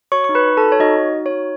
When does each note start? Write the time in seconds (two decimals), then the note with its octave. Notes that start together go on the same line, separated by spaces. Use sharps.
0.12 F#4 C#5 C#6
0.24 D#4 C#6
0.35 B4 B5
0.46 D#4
0.57 A4 A5
0.63 F#4
0.72 C#5
0.80 D#4 F#4 D#5
0.97 D#4
1.14 F#4
1.26 C#5
1.31 D#4